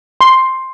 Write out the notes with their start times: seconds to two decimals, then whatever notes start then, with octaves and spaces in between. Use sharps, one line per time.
0.21 C6